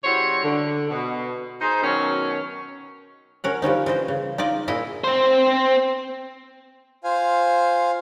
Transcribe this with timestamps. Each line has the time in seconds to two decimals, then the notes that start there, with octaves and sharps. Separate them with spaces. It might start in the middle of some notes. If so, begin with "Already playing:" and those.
0.04 C#3 G3 E4 F#4 C5 C#5
0.43 D3
0.91 B2
1.61 D#4 G#4 C5
1.83 B2 D#3 F#3 C#4
3.44 C#4 A#4 F#5
3.62 F3 G3 C#4 D#4
3.86 E3 C5 D#5
4.08 C#3
4.38 D#4 F4 D5 D#5
4.68 A#2 E4 G#4 D#5
5.04 C4 C5
7.04 F4 C5 F5 G#5